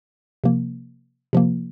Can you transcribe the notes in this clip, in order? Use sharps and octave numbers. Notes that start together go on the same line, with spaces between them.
C3 F3 A#3
C3 F3 A#3